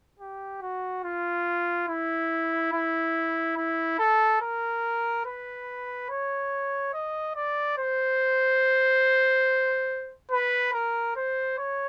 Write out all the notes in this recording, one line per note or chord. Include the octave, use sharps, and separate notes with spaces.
G4
F#4
F4
E4
E4
E4
A4
A#4
B4
C#5
D#5
D5
C5
B4
A#4
C5
C#5